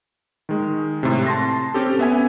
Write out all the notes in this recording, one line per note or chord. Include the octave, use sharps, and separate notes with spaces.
D#3 G#3
A2 C3
A5 C6 A#6
C4 C#4 G4 A4
B3 E5 G#5